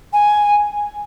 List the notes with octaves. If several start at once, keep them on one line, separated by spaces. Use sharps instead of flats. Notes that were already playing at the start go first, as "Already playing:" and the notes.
G#5